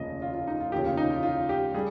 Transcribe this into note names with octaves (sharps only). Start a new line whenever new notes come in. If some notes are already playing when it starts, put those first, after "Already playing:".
Already playing: F1 D#2 C#3 F3 D#5
F4
F4
D#4
F4
F1 D#2 C#3 F3 G4
F4
D#4
F4
F4
G4
G3 G#4